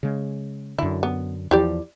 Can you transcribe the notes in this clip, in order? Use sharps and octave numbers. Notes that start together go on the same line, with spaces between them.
C#3 G#3
F#2 D3 E4
B3
E2 F3 E4 G4 D5